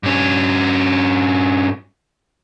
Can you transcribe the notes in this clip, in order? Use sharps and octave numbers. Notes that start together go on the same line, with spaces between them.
G2 C#4